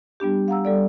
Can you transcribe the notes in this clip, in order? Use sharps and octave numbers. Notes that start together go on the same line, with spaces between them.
G3 B3 D4 G4
F5 F#5 A#5 E6
G3 A4 D5